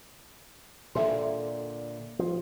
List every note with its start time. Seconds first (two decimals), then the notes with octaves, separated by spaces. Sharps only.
0.95 A#2 D3 A4 E5 C6
2.19 F3